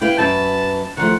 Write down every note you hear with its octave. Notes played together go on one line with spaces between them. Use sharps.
E4 B4 F5 G5
F#2 B4 A5
D#3 F3 A3 F#5